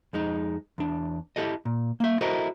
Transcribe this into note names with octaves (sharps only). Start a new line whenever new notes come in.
F2 G#3 D#4
E2 D4
E4 F#4 G4 A4 D#5
A#2
A#3 E5
E4 F#4 A4 A#4 C5 D#5